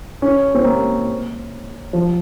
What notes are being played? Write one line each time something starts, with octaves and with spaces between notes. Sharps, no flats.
C#4
C4
A#3
F3